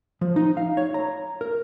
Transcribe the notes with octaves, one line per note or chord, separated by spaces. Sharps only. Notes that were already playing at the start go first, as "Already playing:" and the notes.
F3
D#4
F5
C#5
A#5
A#4